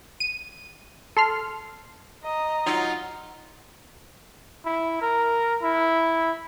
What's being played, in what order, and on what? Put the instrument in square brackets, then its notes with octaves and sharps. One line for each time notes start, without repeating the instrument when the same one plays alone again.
[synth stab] D#7
A4 C6 F6
[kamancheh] D#5 [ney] A#5
[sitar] F#3 D#4 [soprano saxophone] F4
[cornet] E4
A#4
E4